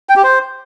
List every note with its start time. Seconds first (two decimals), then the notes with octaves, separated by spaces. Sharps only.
0.09 G5
0.16 G4
0.24 C5